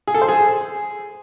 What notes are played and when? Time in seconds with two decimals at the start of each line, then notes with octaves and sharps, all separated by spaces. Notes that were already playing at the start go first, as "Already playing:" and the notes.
0.07 G#4
0.14 A4
0.21 C5
0.28 G#4